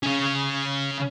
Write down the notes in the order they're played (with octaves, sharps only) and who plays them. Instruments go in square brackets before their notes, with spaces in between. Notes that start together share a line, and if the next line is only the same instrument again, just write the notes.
[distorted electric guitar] C#3 C#4